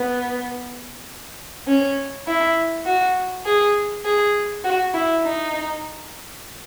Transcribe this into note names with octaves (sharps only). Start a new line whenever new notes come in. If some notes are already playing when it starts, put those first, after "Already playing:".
Already playing: B3
C#4
E4
F#4
G#4
G#4
F#4
E4
D#4